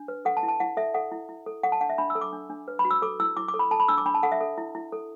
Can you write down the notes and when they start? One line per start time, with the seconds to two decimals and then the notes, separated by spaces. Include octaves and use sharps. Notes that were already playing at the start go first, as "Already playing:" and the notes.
Already playing: D4
0.08 B4
0.25 A4 F#5
0.37 A5
0.43 E4
0.48 A5
0.60 E4 F#5
0.77 A4 E5
0.94 A4 F#5
1.12 E4
1.29 E4
1.46 A4
1.63 A4 F#5
1.72 A5
1.81 D4 F#5
1.90 E5
1.98 D4 B5
2.10 E6
2.15 A4
2.21 D6
2.33 D4
2.50 D4
2.68 B4
2.79 B5
2.85 F#4
2.91 E6
3.02 A4 D6
3.20 E4 E6
3.37 E4 D6
3.48 D6
3.54 A4
3.59 B5
3.71 A4 A5
3.80 B5
3.88 D4 E6
3.98 D6
4.06 D4 B5
4.14 A5
4.23 A4 F#5
4.32 E5
4.41 A4
4.58 E4
4.75 E4
4.92 A4